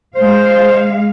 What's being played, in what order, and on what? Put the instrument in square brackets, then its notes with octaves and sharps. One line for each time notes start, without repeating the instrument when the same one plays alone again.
[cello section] G#3 F5 [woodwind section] C5